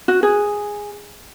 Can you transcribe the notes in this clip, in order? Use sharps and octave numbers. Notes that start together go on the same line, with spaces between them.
F#4
G#4